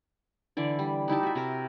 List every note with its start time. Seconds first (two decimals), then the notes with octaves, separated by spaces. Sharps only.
0.57 D3 E3 D5
0.79 G3
1.08 D#4 E4 G4 A5
1.23 F#4 E5
1.35 C3 A#4